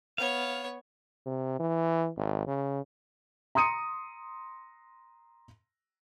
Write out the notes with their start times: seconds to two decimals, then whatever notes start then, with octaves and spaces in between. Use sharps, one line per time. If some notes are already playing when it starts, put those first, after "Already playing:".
0.18 B3 C#5 F5
1.26 C3
1.59 E3
2.16 G#1
2.47 C#3
3.55 A#5 C6 D#6 C#7 D#7